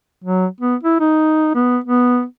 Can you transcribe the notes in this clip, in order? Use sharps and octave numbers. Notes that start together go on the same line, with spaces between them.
F#3
B3
E4
D#4
B3
B3